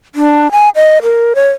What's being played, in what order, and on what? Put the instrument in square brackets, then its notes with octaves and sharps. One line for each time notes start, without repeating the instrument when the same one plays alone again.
[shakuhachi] D4
G#5
D#5
A#4
C#5